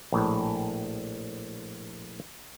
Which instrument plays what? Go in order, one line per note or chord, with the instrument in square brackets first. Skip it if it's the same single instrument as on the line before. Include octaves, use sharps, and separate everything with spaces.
[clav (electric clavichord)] A#1 A2